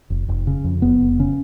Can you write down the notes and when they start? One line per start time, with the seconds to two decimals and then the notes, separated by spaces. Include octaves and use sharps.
0.10 F1
0.28 F1
0.47 C#3
0.64 F2
0.82 F1 B3
1.00 F1
1.19 C#3 C#4